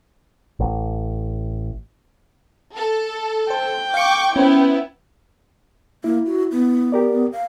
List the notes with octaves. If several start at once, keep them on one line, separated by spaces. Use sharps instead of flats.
A1
A4
C5 G5
F5 C#6 D6 C#7
B3 C#4 E4 C5
A#3 E4
F#4
B3
G4 A#4 D5
F5